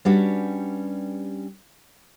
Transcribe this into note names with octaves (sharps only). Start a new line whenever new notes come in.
G3 C#4 D4 F#4 G4 B4